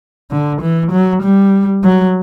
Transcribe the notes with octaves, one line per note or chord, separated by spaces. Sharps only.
D3
E3
F#3
G3
F#3